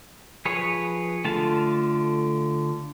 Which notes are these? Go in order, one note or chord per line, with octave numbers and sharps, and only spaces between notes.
F3 G#4 B4 C#5
D3 A3 F4 A5